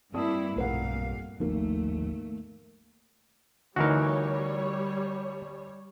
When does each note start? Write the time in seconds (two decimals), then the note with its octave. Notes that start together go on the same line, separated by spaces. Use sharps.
0.14 G2 A#3 C4 E4 D5 A5 D#6
0.56 F1 B1 G2 A#2 A#4 F5 F#5
1.40 G#1 D#2 D#3 F3 A3 A#3
3.76 D2 E3 G3 D#4 F#4 A#4 C#5